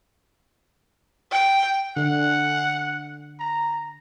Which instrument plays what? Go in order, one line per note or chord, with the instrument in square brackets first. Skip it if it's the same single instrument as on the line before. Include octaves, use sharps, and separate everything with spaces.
[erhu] G5
[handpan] D3 [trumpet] F#5
[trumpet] A#5